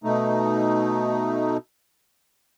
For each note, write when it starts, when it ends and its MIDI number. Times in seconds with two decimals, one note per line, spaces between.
0.04 1.57 47
0.04 1.57 57
0.04 1.57 63